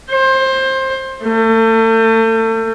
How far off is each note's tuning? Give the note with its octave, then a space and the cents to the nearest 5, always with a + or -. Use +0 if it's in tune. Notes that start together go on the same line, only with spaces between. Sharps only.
C5 +20
A3 +35